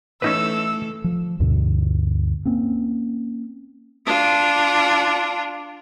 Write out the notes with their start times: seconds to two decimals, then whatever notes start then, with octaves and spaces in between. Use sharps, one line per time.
0.22 E3 A3 C#4 D#4 A4 B4 E6
1.04 F3
1.40 D2 G2 B2 D3
2.45 A#3 C4 C#4
4.06 D4 F4